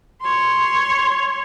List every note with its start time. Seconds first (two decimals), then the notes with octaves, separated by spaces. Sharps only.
0.22 C#5 C6